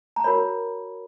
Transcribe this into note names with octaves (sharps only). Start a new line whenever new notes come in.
A#5
F#4 A#4 C#5 B5